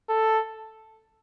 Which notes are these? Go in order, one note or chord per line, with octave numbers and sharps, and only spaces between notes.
A4